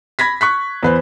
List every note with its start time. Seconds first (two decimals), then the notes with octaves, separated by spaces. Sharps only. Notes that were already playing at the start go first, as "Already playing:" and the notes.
0.19 B5 G#6 A#6 B6
0.41 C#6 F#6 B6
0.83 E2 B4 C5